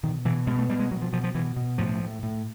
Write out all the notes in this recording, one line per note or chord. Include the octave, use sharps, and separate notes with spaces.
B2 D#3
B2 E3
B2 G#3
A3
B2 G3
G#3
B2 F#3
F3
B2 F3
F3
B2 E3
B2
A2 F3
A2
A2